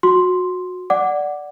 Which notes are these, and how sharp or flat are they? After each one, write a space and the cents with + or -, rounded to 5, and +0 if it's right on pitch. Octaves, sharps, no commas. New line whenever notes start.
F#4 -25 C6 +0
D5 +0 F#5 +0 D6 +0